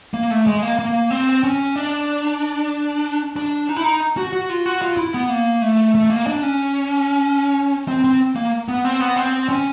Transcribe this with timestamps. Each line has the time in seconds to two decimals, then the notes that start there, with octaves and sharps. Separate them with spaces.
0.14 A#3
0.31 A3
0.47 G#3
0.63 A#3
0.79 A#3
1.11 C4
1.44 C#4
1.76 D4
3.36 D4
3.69 D#4
3.77 E4
3.84 D#4
4.17 F#4
4.33 F#4
4.50 F4
4.66 F#4
4.82 F4
4.97 E4
5.14 B3
5.29 A#3
5.62 A3
5.95 A3
6.10 A#3
6.27 D4
6.43 C#4
7.88 C4
8.04 C4
8.36 A#3
8.68 B3
8.85 C4
9.00 B3
9.16 C4
9.49 C#4